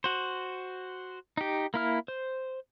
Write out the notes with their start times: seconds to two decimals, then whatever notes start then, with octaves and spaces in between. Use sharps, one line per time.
0.04 F#4 C5
1.37 D#4 G4
1.74 A#3 E4 F6
2.08 C5